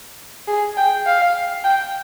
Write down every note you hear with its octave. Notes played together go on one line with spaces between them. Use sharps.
G#4
G5
F5
G5